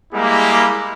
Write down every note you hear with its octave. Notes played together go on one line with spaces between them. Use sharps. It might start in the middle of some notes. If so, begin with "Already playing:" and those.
G3 G#3 A#3 E4 G4